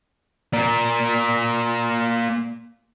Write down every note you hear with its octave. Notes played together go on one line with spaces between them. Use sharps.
A#3 D5